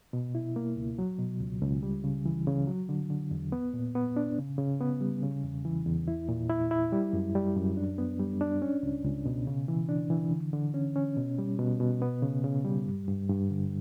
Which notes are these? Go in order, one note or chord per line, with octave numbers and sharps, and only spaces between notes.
B2
E4
A#3
C#2
F#3
B2
C#2
C#2
G3
C#3
E3
C#3
F#3
D3
D3
E2
B3
A#2
B3
D4
C#3
C#3
B3
G3
C#3
E2
E3
E2
E4
A#2
E4
E4
G3
F#2
G3
F#2
D4
B3
G3
D4
C#4
C#2
C#2
B2
C#3
E3
D4
E3
D3
D3
C#4
C#4
B2
G3
B2
B2
B3
C#3
C#3
G3
G2
G2
G2
D3